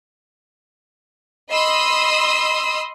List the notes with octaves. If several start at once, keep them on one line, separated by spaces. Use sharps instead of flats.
D#5 B5 C6 D#6 E6